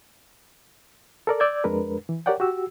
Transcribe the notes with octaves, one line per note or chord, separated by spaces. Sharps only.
A4 A#4 D5
D5 E6 G6 G#6
F2 G#3 D4 A#4 B4
E3
G4 A#4 C#5 D5 F#5 G5
F#4 G4 E6